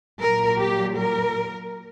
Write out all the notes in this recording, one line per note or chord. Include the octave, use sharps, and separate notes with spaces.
A#2 F#3 A#4
G4
A#4